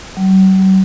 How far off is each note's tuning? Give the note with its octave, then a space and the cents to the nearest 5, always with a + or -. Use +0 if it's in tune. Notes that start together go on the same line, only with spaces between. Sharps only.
F#3 +45